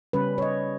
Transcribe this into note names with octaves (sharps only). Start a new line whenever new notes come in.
C#3 G3 C#4 B4
C#5
D#5